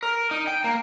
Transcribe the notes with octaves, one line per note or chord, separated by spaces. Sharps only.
A#4
D#4
G5
A#3